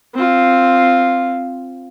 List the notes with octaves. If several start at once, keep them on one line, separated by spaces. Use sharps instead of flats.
C4 F4